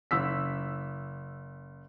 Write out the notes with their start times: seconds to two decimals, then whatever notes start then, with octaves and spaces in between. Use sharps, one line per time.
0.11 F#1 E6 B6